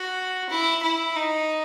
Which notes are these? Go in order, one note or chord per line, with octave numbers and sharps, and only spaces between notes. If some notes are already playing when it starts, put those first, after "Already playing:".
Already playing: F#4
E4
E4
D#4